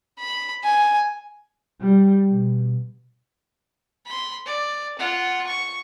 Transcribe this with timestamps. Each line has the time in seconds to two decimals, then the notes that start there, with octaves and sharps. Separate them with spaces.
0.20 B5
0.63 G#5
1.81 G3
2.29 B2
4.06 B5 C6
4.46 D5
4.99 F4 F#5
5.47 C#6